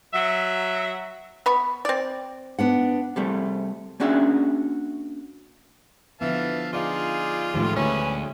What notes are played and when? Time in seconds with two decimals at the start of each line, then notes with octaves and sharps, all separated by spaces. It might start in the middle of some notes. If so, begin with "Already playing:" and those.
0.14 F#3 E5
1.46 B3 B5 C#6
1.85 C4 D5
2.58 B3 D4 F#5
3.16 C3 G3 A3
4.00 A#3 C#4 D4 F#4 G#4 E5
6.21 D3 E3 F3 B3 E5 F5 A5
6.73 D3 D#4 F4 G#4 D5 F5
7.54 A2 D#3 F3 G#3 A3 G4
7.76 D2 C#4 B4 G#5